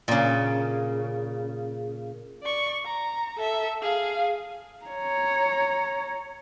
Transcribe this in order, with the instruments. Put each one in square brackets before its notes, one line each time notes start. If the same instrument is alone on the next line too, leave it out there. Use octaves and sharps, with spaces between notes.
[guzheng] A#2 C#3
[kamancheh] D5 C#6
A#5
A4 E5
G#4 F5
[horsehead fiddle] C#5 A#5